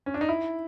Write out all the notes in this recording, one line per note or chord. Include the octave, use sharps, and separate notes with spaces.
C#4
D4
D#4
E4